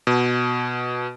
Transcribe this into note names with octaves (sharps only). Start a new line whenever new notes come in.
B2